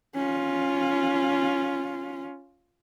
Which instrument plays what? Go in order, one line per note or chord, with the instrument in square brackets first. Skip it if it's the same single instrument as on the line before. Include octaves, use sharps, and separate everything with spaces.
[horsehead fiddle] C#4 F4